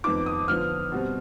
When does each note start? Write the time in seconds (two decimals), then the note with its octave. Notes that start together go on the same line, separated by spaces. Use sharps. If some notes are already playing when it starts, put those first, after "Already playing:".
0.04 F2 D#3 B3 D#4 D6
0.26 D#6
0.48 D3 F3 B3 D4 F6
0.92 B2 G3 C4